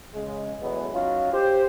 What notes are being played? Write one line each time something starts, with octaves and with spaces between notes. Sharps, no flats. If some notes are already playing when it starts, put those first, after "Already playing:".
C#3 G#3
E2 A2 E3 F#3 G#3 B3
F#3 C#4 D#4 F4
G4 C5